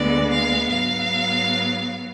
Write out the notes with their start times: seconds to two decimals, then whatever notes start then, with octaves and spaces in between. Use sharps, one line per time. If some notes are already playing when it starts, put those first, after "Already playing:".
Already playing: D2 D3 G#3 B3 D5
0.31 F5
0.70 G#2 F#3 B3 F5